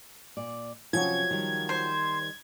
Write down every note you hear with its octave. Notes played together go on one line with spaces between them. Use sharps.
A#2 D5
C3 F3 F#3 C#4 F#4 G#6
D#3 G3
C5